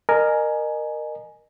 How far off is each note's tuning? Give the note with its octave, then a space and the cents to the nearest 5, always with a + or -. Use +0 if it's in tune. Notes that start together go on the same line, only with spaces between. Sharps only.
A#4 +0 D#5 -30 G#5 +15